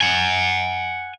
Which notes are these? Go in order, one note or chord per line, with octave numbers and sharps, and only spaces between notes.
F#5 G#5